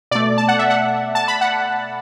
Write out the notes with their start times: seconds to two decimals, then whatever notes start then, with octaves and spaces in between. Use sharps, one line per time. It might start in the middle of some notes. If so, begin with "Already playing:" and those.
0.11 B2 A3 D5
0.38 A5
0.48 F#5
0.59 E5
0.70 F#5
1.15 A5
1.28 B5
1.41 F#5